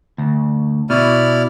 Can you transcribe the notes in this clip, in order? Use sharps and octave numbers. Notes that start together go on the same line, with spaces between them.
D2
B2 E4 D5 F6